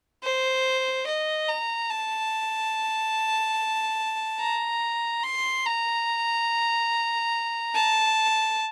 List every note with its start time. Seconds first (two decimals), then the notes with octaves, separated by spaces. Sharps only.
0.23 C5
1.06 D#5
1.48 A#5
1.90 A5
4.40 A#5
5.23 C6
5.65 A#5
7.74 A5